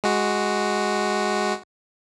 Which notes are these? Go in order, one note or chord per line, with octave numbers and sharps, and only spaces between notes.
G#3 F#4